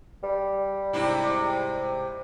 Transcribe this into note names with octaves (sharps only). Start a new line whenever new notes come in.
G3
G#2 C3 E4